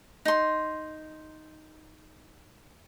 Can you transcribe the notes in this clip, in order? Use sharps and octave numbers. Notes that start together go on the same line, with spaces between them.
D#4 C6